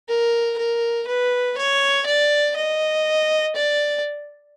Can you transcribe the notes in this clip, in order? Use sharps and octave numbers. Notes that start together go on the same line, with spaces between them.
A#4
A#4
B4
C#5
D5
D#5
D5